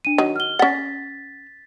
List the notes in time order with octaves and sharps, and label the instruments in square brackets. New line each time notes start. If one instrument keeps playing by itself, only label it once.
[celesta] D4 D#7
[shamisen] D#3 F#3
[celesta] F6 G7
[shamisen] C#4 F#5 [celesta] A6 B6